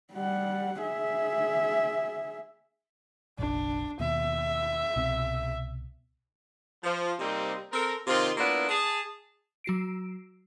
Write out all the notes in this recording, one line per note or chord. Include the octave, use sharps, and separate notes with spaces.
G3 F#5
G#4 E5
F#1 B1 D4
D#2 B2 E5
C2 B2 C4
F3
C3 G3 A#3 C4 D#4
C4 A4 A#4
C3 D#3 C4 F4
A#3 B3 D4 E4 F4
G#4 A5
F#3 F#4 C7 D7